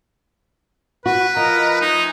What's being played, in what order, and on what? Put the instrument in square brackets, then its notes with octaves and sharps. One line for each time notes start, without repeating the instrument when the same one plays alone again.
[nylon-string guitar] F#4 [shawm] B4
[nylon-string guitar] F3 [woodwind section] A#4 D#5 A#5
[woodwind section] A3 F4 G#5 [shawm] D#4